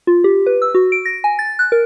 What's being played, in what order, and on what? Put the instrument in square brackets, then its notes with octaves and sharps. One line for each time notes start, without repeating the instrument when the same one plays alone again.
[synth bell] F4
G4
B4
E6
F#4
D7
A#6
G#5
A6
F#6
A#4